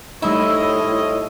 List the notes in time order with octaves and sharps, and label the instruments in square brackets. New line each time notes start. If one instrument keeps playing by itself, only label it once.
[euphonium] A2 [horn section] F3 C#5 D#5 [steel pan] G3 A3 D#4 [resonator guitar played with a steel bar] E4